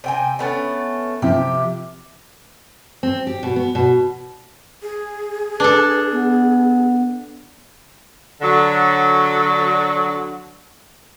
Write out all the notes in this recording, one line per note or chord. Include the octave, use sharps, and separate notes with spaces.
C3 G5 G#5
A3 B3 C#4
C3 F3 G4
C4
G4
B2
B3
B2
G#4
D4 A4 B4
B3
D3 F#3